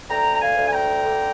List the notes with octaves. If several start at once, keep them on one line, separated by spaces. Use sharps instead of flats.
D2 G5 A#5
A#5
F5 G#5
D2
G#5
G5 A#5
D3